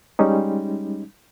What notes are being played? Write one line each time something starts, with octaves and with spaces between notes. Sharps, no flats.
G3 G#3 C#4 D#4